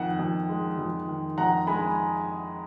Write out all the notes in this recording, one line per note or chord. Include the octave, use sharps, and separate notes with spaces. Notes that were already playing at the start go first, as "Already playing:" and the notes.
Already playing: F2 D#3 F#5
F2
G#3
F2
D#3
F2 F#5 A#5
G#3 G#5 B5